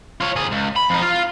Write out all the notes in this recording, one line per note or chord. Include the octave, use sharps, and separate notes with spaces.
F4 C#5
D#2 G#4
C#2
B5
F2 D#4
F4 F5